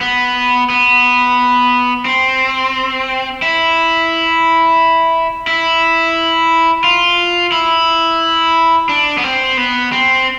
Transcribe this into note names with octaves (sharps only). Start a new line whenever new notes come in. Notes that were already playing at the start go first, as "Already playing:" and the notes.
B3
B3
C4
E4
E4
F4
E4
D4
B3
C4
B3
C4